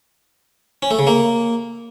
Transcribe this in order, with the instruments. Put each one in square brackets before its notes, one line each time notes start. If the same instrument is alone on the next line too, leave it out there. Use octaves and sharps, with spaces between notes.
[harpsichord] C#4
A3
C#3
A#3